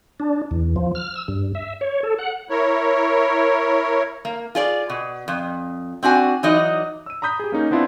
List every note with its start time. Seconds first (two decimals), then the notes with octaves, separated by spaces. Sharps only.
0.20 D4
0.51 E2
0.76 F3
0.95 F6
1.15 E6
1.28 G2
1.55 E5
1.81 C#5
2.03 A4
2.19 F#5
2.50 E4 A#4 C#5
4.25 A#3
4.55 F4 G#4 D5
4.90 B2
5.28 F2
6.03 C4 D4 F#4 G#5
6.43 E3 F#3 D#4 D5 D#5
7.06 E6 D#7
7.22 A#5 B5 D#6 G6 B6
7.40 G4 G#4
7.52 A#3 C#4 D#4
7.71 B3 C4 D4 E4 F4